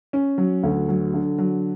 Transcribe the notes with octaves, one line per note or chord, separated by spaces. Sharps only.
C#4
F#3
D2
F#3
D3
F#3